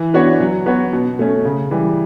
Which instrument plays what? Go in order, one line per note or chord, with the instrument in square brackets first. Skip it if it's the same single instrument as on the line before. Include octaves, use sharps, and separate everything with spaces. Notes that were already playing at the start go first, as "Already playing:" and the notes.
Already playing: [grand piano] E3
B3 D4 F#4 C#5
F#3
B3 F#4 C#5
B2
A3 C#4
C#3
E3 G3